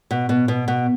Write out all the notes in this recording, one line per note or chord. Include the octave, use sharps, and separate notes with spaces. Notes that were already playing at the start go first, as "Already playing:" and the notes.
B2
B2
B2
B2